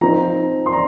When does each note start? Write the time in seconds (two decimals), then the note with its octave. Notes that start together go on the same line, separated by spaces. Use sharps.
0.01 F3 C4 D#4 A#5
0.66 C6
0.73 A#5